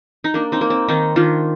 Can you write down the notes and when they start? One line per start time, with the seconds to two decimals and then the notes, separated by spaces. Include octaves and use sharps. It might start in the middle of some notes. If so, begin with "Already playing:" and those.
0.24 D#4
0.34 A#3 D4
0.52 C4 D#4
0.61 A#3
0.70 C4
0.88 D#3 C4 D#4
1.16 D#3 D4 F4